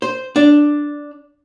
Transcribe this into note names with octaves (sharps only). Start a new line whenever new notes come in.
C5
D4